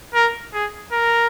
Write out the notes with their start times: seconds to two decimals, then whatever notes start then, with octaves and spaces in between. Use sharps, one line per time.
0.14 A#4
0.53 G#4
0.92 A#4